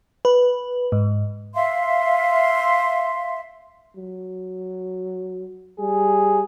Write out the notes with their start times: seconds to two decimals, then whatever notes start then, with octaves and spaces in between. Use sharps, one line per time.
0.25 B4
0.92 G#2
1.55 E5 F5 C6
3.96 F#3
5.80 G3 G#4